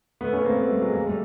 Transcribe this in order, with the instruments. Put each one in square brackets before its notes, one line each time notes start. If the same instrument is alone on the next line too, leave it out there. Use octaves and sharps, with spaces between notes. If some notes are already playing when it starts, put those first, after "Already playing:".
[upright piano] A3 B3
B3 C#4
A#3 C4
A3 B3
G3 A3
F#3 G#3
G#3 A#3
G3 A3